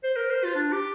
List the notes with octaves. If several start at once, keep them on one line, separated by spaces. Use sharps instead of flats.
C5
A#4
C5
F4
D4
G4